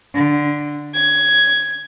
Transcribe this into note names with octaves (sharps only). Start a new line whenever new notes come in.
D3
G#6